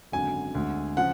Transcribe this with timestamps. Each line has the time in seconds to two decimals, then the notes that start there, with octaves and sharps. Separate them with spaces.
0.12 G#1 F#2 D3 F#3 G#5
0.55 D2 D3 G#3
0.97 C#3 F3 F#5